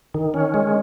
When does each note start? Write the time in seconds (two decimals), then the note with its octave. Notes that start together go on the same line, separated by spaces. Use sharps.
0.14 D#3
0.34 C#4
0.54 G#3